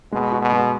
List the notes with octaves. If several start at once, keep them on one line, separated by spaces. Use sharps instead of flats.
B2 G#3
F#4
B2
G#3